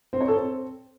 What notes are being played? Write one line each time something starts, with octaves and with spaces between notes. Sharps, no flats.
C4
C#5
A4
C4